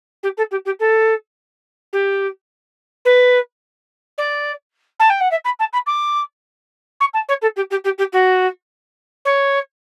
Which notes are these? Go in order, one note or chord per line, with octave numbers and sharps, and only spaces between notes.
G4
A4
G4
G4
A4
G4
B4
D5
A5
G5
F#5
E5
B5
A5
B5
D6
C#6
A5
C#5
A4
G4
G4
G4
G4
F#4
C#5